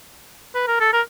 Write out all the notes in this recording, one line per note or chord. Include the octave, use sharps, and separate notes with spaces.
B4
A#4
A4
A#4